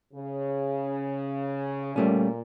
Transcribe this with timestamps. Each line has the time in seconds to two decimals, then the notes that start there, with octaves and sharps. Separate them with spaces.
0.13 C#3
1.96 A#2 G3 A3 C#4